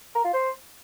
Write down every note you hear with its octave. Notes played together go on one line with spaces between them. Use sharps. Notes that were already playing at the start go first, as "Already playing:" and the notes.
A#4
F4
C5